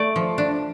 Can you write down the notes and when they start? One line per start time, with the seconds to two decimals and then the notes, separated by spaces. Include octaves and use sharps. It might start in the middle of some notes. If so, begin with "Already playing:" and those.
Already playing: A3 D5
0.16 F3
0.38 D4